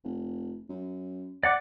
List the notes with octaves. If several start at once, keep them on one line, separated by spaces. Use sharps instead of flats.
F1
F#2
D5 F#5 D6